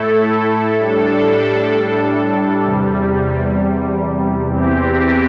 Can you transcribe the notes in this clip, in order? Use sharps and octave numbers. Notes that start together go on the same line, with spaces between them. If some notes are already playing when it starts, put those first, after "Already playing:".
Already playing: A2 A3 E4 A4
A2 G3 D4 A4
E2 C3 G3
E2 E3 C4 G4